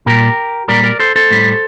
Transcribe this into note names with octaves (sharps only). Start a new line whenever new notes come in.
A#2 G3 G4 A#4
A#2 G3 A#4 D5
A#4 D5
A4 C5
A4 C5
A2 G3